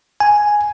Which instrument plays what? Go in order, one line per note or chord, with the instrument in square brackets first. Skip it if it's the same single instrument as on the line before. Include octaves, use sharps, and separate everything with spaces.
[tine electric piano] G#5